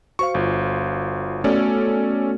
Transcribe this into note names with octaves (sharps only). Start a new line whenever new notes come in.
F#4 C5 F5 C#6
G1 F4
A3 B3 C#4 F#4 A4 D5